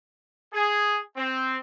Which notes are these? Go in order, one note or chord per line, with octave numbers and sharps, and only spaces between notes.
G#4
C4